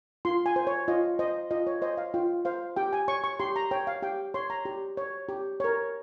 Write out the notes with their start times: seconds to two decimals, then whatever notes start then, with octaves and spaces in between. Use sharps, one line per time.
0.25 F4 C6
0.46 G#5
0.56 C5
0.67 C#5
0.88 F4 D#5
1.19 C5 D#5
1.51 F4 D#5
1.67 C#5
1.82 C5 D#5
1.97 F5
2.14 F4 G5
2.45 C5 F5
2.76 G4 G5
2.93 G#5
3.08 C#5 C#6
3.24 C#6
3.39 G4 C6
3.56 A#5
3.71 C#5 G5
3.87 F5
4.02 G4 G5
4.34 C#5 C6
4.50 A#5
4.65 G4
4.97 C#5
5.29 G4
5.60 A#4 C#5